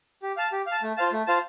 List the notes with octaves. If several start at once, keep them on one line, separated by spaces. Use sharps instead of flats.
G4
F5 A5
G4
F5
A5
A3
F4 C5 F5 A5
A3
F4 C5 F5 A5